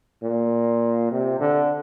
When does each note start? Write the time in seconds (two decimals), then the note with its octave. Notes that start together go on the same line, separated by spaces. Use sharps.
0.23 A#2
1.11 C3
1.40 D3